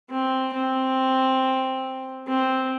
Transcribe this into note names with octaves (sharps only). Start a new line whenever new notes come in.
C4
C4
C4